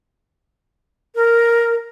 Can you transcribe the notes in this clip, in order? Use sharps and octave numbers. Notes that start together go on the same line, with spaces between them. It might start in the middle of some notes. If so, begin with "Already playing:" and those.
A#4